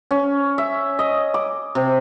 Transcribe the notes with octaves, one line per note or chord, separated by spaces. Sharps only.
C#4
E5
D#5
D6
C3